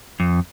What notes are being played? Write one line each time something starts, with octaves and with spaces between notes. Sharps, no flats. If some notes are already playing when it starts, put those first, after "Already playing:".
F2